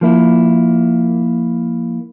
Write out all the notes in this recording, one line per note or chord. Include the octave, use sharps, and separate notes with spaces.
F3 A#3 E4